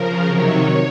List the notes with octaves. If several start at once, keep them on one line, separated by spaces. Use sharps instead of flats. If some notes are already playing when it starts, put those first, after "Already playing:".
Already playing: C#3 F3 A#4
C3 D#3 F#3 C#5